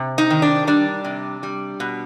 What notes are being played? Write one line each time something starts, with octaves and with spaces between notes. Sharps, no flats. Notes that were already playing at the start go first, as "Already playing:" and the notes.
Already playing: C3
D#4
D#3
D4
G3 D4
C3
G3
B2